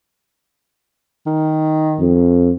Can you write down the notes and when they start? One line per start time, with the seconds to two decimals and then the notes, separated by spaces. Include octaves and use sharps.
1.27 D#3
2.00 F2